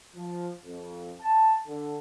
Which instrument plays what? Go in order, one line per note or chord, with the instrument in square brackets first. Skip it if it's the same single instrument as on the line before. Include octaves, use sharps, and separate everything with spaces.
[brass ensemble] F3
F2
A5
D3